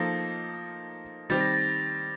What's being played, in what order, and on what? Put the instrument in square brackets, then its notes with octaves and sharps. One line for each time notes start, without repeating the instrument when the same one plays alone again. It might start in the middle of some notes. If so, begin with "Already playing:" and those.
Already playing: [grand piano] F3 A#3 D#4 A4 [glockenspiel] A#6
[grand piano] D#3 G3 C4 G4 [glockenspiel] A6
[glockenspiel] A#6
A6